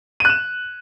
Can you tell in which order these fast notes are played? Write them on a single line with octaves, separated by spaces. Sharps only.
D#7 F#6 E7